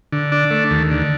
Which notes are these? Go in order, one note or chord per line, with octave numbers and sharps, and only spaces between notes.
D3
D4
A3
D#2
D3